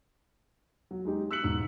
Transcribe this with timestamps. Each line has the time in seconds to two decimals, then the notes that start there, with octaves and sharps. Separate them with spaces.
0.91 F#3
1.05 G#3 D#4 G4
1.31 E6 F#6 B6 C#7 F#7
1.43 E1 G#2